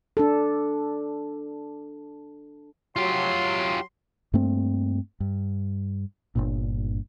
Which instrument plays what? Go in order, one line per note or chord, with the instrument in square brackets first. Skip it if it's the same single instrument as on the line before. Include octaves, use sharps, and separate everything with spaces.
[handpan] D4 A4
[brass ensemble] F#3 [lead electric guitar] F4 G4 [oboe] C6
[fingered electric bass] G2 A3 A#3 C4
G2
G1 G2 A#2